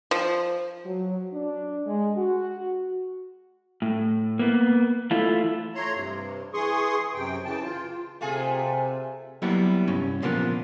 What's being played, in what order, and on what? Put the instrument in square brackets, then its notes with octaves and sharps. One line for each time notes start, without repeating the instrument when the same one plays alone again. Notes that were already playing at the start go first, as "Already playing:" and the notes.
[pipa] F3
[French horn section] F#3
D4
G#3
F#4
[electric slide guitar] A2
A#3 B3
E3 A3 E4 F4
[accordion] A3 C#5 A#5 C6
G2 C3
E3 G#4 C6 C#6 D#6
F#2 C3 G5
C#3 E3 G5 A5
F4
[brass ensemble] C3 [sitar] A3 F4 G#4 [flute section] G#5
[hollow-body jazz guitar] F#3 G3 A#3 B3 E4 F#4
C2 G2 C#4
A#2 C#3 F3 A#3 B3 D4